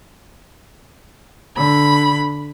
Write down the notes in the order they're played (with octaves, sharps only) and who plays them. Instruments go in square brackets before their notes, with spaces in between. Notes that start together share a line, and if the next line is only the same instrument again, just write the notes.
[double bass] D3 [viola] B5